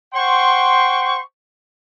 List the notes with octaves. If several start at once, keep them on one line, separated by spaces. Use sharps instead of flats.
C5 F#5 G5 C6 C#6